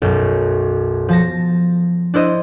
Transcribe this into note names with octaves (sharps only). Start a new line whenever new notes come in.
B1 F#2
F3 A5 A#6
D4 E4 C5 D#5